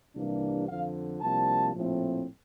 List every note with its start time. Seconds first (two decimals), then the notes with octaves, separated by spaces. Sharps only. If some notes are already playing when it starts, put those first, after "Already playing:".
0.15 C2 C3 E3 A#3 D4
0.68 F2 D3 F3 F5
1.21 C2 C3 F3 A#3 D4 A5
1.73 A#1 A2 F3 A3 C4